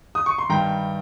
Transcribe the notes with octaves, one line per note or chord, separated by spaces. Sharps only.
D#6
C#6
C6
G2 D#3 G3 G5 A#5